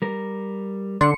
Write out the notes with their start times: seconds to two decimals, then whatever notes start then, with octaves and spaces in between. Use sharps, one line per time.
0.02 G3 A#4
1.01 D3 D4 C6 C#7